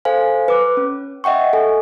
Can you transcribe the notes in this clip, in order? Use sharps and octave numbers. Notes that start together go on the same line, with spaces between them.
A4 C5 F5 G#5
B4 D6 F#6
C#4
D#5 E5 F#5 G5 C#6
A4 G#5